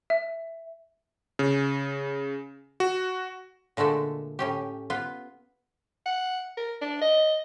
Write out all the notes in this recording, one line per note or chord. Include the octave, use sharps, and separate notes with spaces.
E5
C#3
F#4
A#2 D3 G#3 A3 A4
A2 C#4 G4
B3 F4
F#5
A#4
D4
D#5